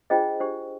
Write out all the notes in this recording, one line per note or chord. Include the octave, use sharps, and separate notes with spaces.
D4 F4 G#4 C5 D#5 G5
D4 G4 C5